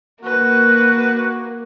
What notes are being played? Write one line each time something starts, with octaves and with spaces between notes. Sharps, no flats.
A#3 F#4 B4